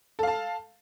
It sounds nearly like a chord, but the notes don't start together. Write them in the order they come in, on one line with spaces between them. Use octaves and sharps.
A4 F5 A5